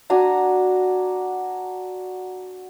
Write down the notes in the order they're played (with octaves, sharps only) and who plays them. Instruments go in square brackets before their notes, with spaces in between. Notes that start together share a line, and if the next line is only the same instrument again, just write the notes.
[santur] D4 F#4 G#5 A#5